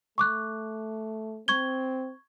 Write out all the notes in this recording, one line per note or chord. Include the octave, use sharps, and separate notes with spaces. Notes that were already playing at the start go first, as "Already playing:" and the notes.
A3 C#6 D6 F#6
C4 C#6 G#6 G7